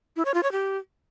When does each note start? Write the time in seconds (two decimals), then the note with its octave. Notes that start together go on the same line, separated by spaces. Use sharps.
0.16 E4
0.25 C#5
0.34 F4
0.43 C#5
0.52 G4